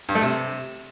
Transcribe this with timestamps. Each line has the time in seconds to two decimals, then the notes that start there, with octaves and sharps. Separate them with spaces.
0.09 G2
0.15 A3
0.22 C3